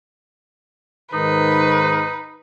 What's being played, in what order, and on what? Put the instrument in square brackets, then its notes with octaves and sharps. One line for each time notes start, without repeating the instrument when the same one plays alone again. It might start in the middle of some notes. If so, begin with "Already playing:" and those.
[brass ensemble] G#2 D#3 [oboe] D#4 [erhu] B4